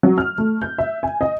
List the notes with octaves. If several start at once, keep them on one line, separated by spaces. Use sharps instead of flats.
F#3
F6
A3
G6
E5
G#5
D#5